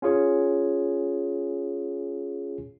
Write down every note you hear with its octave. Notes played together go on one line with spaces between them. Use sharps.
C#4 F4 G#4 C#5